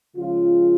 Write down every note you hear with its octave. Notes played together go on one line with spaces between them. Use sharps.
C#3 F3 G#3 F4